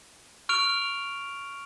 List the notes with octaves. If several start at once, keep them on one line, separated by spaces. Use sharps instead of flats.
C#6 F6 D7 F7